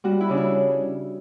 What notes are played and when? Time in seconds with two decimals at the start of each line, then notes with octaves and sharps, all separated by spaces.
0.04 G3 F#4
0.21 E4
0.30 C#3 D4
0.37 E4